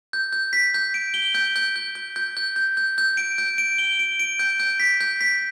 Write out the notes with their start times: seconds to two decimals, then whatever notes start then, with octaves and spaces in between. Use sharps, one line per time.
0.13 G6
0.33 G6
0.53 B6
0.74 G6
0.94 D7
1.14 G7
1.35 G6
1.56 G6
1.76 G6
1.95 G6
2.16 G6
2.37 G6
2.56 G6
2.77 G6
2.98 G6
3.17 D7
3.38 G6
3.58 D7
3.78 G7
3.99 D7
4.19 D7
4.39 G6
4.60 G6
4.80 B6
5.00 G6
5.21 B6